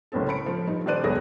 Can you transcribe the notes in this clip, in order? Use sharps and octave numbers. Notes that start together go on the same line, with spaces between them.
F#1 C2 A2 C4 A4
B5 C#7 D7
F3
G2 D#4
D#1 B4 C5 D5 F#6 D#7
C#2 F#2 B2 G#4 C#5 A#6